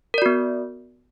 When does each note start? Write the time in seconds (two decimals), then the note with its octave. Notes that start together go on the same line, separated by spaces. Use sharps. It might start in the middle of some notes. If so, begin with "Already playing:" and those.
0.14 A#4
0.18 D5
0.22 F#4
0.26 B3